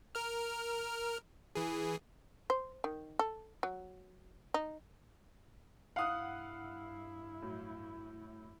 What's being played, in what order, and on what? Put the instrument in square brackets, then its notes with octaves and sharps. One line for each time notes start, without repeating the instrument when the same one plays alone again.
[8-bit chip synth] A#4 F6
E3 G#4
[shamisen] C5
D#3
A4
F#3
D#4
[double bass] G2 E4 [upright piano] F5 D#6 [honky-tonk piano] F#5 F#6
[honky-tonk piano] A2 F#3